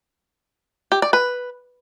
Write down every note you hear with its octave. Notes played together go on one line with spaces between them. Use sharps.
G4
D5
B4